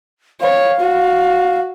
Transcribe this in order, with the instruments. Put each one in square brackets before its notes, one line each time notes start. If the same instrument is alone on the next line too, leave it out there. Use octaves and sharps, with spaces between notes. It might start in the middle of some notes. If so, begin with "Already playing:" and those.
[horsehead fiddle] C#5 [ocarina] F5
[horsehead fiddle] F#4